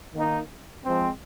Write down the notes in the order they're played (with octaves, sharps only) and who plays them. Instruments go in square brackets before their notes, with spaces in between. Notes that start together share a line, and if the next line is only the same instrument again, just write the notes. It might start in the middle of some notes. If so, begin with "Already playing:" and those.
[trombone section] D#3 A#3 D#4
F3 G#3 C4